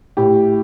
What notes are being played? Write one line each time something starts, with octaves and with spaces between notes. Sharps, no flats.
A2 G4